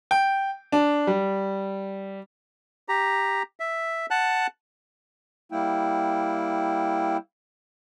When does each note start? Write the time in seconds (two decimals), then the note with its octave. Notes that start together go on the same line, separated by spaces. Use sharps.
0.11 G5
0.72 D4
1.07 G3
2.89 G4 A#5
3.60 E5
4.11 F#5 A5 F#6
5.52 G3 A#3 E4 G5